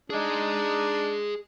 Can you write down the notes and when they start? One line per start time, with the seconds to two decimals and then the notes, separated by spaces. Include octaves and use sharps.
0.10 D4 D#4 G#4 D#5